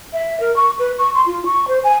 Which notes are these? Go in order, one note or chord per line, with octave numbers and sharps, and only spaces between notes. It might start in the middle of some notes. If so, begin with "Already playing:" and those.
E5
A#4
C#6
B4
C#6
C6
F4
C#6
C5
G#5